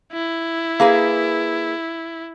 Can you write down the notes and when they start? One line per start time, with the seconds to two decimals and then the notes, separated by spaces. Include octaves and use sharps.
0.12 E4
0.80 A#3 G#4 B4 F5